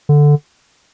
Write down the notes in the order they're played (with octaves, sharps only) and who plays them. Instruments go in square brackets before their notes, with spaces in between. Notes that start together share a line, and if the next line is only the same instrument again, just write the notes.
[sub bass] D3